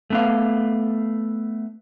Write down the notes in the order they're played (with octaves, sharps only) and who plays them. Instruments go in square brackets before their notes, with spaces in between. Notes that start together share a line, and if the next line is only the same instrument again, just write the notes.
[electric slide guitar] A3 B3 F5